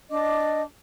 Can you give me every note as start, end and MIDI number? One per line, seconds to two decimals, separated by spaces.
0.10 0.62 62
0.10 0.62 75
0.10 0.62 86